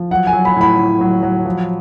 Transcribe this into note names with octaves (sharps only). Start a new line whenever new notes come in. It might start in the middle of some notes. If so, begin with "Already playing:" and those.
Already playing: F3
F#3 F#5
G#5
F#3
B5
A2 B5
A2
F#3
F#3
F3